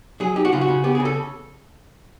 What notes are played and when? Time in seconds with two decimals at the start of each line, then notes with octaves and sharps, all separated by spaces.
0.20 F#3 G#4
0.36 D#4 G4
0.45 F#4
0.52 C#3 F4
0.61 F#4
0.68 C#3
0.84 B3 G4
0.95 G#4
1.00 C#3
1.05 A4